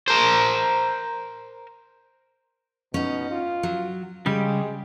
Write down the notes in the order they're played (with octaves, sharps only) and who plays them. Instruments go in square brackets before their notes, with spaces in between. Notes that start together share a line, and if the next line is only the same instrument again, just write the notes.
[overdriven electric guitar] A#4 C5
[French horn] B2 [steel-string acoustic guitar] C#4 D#4
[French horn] F4
[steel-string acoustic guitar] F#3
[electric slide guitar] C#3 G3 [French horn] G#3 [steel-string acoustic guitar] G4